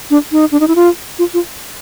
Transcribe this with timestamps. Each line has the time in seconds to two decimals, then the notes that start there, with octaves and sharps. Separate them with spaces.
0.10 D4
0.32 D#4
0.52 D4
0.60 D#4
0.68 E4
0.76 F4
1.19 F4
1.34 F4